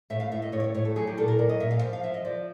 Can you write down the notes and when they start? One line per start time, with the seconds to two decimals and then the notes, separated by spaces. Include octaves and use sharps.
0.10 A2 E5
0.20 F5
0.32 A2 E5
0.42 D#5
0.52 A2 C#5
0.60 D5
0.64 C#5
0.74 A2 C#5
0.85 A4
0.96 F#3 G#4
1.07 G4
1.17 A#2 A4
1.28 A#4
1.39 F#3 D5
1.49 D#5
1.60 A#2 E5
1.71 F5
1.82 F3
1.93 F5
2.03 F3 E5
2.14 D#5
2.25 F3 D5